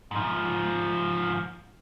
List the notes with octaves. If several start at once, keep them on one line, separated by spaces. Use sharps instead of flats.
G#2 F3